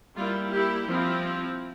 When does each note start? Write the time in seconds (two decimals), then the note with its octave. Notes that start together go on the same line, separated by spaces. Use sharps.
0.15 G3 A#3 E4 F4
0.52 E4 G4
0.88 F3 C4 E4